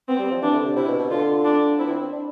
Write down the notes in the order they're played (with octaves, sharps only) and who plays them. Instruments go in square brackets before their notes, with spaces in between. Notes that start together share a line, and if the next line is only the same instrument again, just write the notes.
[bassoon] B3 [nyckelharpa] C4
[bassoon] G3
F3
[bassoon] E3 [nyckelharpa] D4
[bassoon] D3
C3
[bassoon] C3 [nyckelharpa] E4
[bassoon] B2
B2
[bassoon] D3 [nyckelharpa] F4
[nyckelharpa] D4
[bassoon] C4 [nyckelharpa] E4
[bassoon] B3
C4
C4
D4